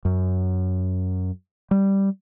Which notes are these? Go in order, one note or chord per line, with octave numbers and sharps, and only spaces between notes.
F#2
G3